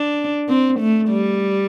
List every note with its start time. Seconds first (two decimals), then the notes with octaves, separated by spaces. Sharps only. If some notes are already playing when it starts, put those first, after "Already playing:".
Already playing: D4
0.49 C4
0.79 A3
1.10 G3